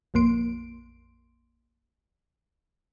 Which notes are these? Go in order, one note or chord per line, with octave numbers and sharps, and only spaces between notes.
A#1 F2 A#3 C6 D7